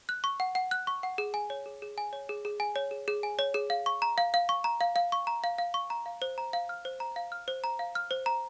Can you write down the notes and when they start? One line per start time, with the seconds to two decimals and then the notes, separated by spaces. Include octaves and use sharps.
0.09 F#6
0.24 C#6
0.40 F#5
0.55 F#5
0.71 F#6
0.87 C#6
1.03 F#5
1.18 G#4
1.34 G#5
1.50 C#5
1.66 G#4
1.82 G#4
1.98 G#5
2.13 C#5
2.29 G#4
2.45 G#4
2.60 G#5
2.76 C#5
2.91 G#4
3.08 G#4
3.23 G#5
3.39 C#5
3.54 G#4
3.70 F5
3.86 C#6
4.02 A#5
4.18 F5
4.34 F5
4.49 C#6
4.64 A#5
4.81 F5
4.96 F5
5.12 C#6
5.27 A#5
5.44 F5
5.58 F5
5.74 C#6
5.90 A#5
6.06 F5
6.22 C5
6.38 A#5
6.53 F5
6.69 F6
6.85 C5
7.00 A#5
7.16 F5
7.32 F6
7.48 C5
7.64 A#5
7.79 F5
7.95 F6
8.11 C5
8.26 A#5